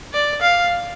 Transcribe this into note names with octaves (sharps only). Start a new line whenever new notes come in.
D5
F5